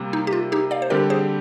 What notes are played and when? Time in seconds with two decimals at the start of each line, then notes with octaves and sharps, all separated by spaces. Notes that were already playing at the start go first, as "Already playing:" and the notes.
Already playing: C3 G3 A#3
0.13 D#4
0.27 G4
0.33 F4
0.52 D#4 G4
0.71 D5 F5
0.82 C5
0.90 D3 G3 C4 G4 A#4 D5
1.10 G#4 C5